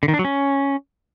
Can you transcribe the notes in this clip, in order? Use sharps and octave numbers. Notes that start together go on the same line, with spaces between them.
D3
D#3
D4
F#3
C#4